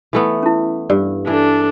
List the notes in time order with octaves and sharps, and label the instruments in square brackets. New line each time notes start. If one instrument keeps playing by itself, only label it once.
[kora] E3 A3 B3
[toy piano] C#4 E4
[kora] G2 [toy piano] D5
[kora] E3 [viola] D4 A4